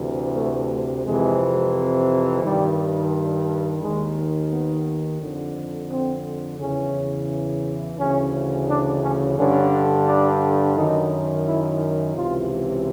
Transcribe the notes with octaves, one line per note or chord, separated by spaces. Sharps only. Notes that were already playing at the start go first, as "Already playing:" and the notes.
Already playing: D2 C3 E3
A3
F2 C3 E3 G#3
G2 D#3 G3
D#2 D#3 G#3
B3
F2 D3
C4
E2 C#3 E3 C#4
D2 C#3 E3 C#4
D4
C#4
G2 D3 C#4
D4
F#2 D#3 D#4
E4
C#2 C3 E3 F4